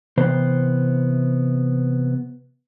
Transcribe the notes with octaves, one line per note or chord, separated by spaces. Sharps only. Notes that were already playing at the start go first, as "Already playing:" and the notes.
C3 E3 B3 C5